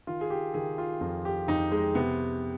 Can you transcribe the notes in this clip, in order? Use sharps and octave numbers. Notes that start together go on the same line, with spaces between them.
D#3 F4
G#4
G4
D#3 G#4
F4
F2
G4
F2 D#4
G#3
C3 B3